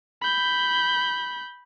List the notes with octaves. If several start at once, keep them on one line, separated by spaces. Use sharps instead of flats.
B5 G6